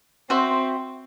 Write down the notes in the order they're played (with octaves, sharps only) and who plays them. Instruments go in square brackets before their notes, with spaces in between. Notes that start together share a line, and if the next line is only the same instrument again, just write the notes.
[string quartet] C4 [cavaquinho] F#4 C5 E5